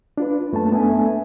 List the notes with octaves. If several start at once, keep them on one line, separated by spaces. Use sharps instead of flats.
D4 F4 B4
F#2 A3 A#3 C#4 A5
A3 B3 D4 A4 E5 G#5